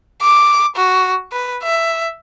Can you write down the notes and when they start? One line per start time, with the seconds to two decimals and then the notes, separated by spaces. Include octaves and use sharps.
0.22 D6
0.76 F#4
1.32 B4
1.63 E5